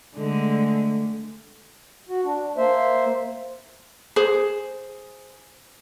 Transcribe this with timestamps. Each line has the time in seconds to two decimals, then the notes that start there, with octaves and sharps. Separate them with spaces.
0.15 D3 G#3 A3
2.09 F#4
2.25 D4
2.57 A#3 C5 E5
4.16 G#4 C5